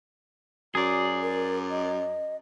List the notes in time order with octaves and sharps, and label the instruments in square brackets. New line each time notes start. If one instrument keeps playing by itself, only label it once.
[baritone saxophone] F#2 [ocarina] F#4 [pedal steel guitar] G#4 D5
[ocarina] A#4
D#5